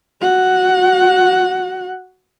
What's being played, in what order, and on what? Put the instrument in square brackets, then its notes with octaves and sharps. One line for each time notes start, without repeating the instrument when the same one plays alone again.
[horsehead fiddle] F#4 F#5